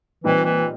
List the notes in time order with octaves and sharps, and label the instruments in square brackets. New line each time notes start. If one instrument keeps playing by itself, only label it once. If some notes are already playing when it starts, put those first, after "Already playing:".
[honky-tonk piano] A#2 G3 C4 D#4 [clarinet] E3
[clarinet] E3